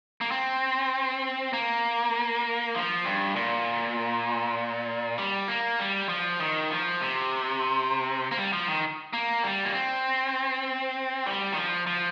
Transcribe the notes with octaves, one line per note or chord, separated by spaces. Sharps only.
A#3
C4
A#3
F3
G2
A#2
G3
A#3
G3
F3
D#3
F3
C3
A#3
G3
F3
D#3
A#3
G3
A#3
C4
G3
D#3
F3
F3